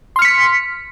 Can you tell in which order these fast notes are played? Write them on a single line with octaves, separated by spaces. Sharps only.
C6 F6 C#7 B6